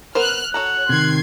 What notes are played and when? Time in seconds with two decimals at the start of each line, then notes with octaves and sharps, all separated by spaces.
0.15 B3 A#4 C5 F6 F#6
0.54 F#4 A4 C#5 A#5 F#6
0.89 C3 D#3 C6 G#6 C7